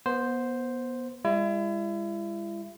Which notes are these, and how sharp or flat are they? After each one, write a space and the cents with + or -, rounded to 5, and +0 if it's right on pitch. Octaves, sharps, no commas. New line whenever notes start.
B3 -25 C5 +0
G#3 -45 E4 +35